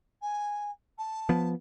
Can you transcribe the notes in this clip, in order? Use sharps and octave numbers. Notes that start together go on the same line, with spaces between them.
G#5
A5
F3 B3